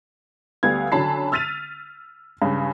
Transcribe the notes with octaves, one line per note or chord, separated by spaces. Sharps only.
D2 G3 B3 F5 G#6
D3 F#3 C#4 A5 B5 C7
E6 F6 A6 B6 D#7 F7
G2 C#3